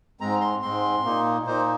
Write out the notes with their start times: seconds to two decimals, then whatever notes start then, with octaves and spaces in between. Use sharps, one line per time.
0.20 G#2 G#3 C4 A#5
0.41 C6
0.62 G#2 G#3 C4 C6
1.04 A#2 A#3 D#4
1.46 A#2 A#3 D#4 C5